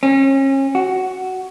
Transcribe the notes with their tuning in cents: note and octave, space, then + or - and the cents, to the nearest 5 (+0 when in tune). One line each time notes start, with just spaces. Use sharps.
C#4 -35
F#4 +10